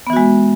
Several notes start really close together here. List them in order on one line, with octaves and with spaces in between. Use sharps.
B3 E3 F#4 G#3